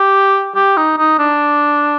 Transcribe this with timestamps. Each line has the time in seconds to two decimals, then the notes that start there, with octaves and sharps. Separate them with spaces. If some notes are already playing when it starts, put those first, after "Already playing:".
Already playing: G4
0.55 G4
0.77 D#4
0.98 D#4
1.19 D4